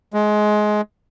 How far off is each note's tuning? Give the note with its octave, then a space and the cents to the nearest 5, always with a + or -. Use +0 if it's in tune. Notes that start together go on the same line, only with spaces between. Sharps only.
G#3 +20